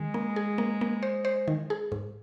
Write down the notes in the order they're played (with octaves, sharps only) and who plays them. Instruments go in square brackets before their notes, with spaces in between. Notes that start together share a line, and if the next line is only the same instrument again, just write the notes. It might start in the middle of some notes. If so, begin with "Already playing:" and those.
Already playing: [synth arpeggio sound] D#3 [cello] G#3
[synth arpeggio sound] A#3
G#4
A#3
A#3
C5
C5
D#3
G#4
G#2